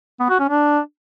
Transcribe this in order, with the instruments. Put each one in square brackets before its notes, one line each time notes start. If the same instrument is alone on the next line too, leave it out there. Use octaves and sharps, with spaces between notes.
[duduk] B3
F#4
C#4
D4